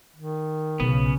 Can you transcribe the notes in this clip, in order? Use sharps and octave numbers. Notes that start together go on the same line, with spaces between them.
D#3
B1 C#3 B3